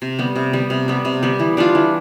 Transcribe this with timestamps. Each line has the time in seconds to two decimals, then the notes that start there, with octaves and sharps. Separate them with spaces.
0.02 C3
0.19 G3 B3
0.36 C3
0.53 G3 B3
0.70 C3
0.88 G3 B3
1.05 C3
1.23 G3 B3
1.39 E3
1.57 G3 D4 F4
1.75 E3